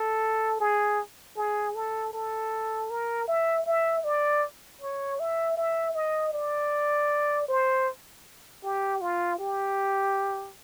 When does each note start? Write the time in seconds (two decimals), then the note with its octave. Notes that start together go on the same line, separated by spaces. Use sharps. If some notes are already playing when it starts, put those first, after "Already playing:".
Already playing: A4
0.60 G#4
1.37 G#4
1.75 A4
2.13 A4
2.90 A#4
3.28 E5
3.66 E5
4.04 D5
4.81 C#5
5.20 E5
5.57 E5
5.95 D#5
6.33 D5
7.48 C5
8.63 G4
9.01 F4
9.39 G4